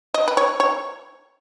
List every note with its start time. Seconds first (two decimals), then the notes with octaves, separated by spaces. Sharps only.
0.14 D#5
0.28 B4
0.37 C#5
0.60 C#5